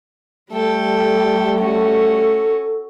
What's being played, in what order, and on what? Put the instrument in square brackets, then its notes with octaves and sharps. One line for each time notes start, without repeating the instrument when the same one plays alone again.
[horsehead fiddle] G3 [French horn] A3 [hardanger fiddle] A4 G5
[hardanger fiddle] C#4 F#4 [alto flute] A4